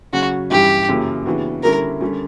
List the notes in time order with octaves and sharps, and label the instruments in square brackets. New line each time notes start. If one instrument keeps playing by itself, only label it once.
[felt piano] C#3 F#3 C#4 [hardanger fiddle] F#4
[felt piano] G2 E3 G3 C#4 [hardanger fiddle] G4
[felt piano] F#2 C#3 E3 A#3
C#3 E3 B3 D4 F#4
[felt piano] D3 G3 C#4 E4 [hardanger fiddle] A#4
[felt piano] D3 G3 C#4